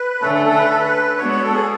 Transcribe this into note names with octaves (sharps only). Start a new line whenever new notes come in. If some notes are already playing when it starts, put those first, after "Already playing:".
Already playing: B4
D3 A3 C#4 A4
A4
A4
B4
A4
B4
G#3 B3 D4 F#4 C#5
C#5
A4
G#4